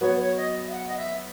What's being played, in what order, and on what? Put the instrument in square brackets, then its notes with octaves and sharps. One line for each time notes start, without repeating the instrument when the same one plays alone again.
[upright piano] F#3 B3 F#4 [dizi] C#5
[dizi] C#5
D#5
E5
F#5
D#5
E5